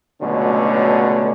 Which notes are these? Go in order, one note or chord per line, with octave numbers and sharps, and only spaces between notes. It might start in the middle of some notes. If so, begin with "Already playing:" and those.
C#2 B2 D3 F#3 A3 C#4